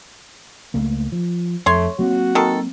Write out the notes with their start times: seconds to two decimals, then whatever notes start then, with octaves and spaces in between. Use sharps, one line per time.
0.74 C#2 A3 A#3
1.12 F3
1.66 F2 A3 C#5 C6
1.99 F#3 A#3 C4 F#4
2.35 D#3 A4